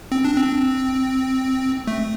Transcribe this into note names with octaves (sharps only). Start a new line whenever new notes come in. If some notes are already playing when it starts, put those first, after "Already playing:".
C4
D4
C4
A3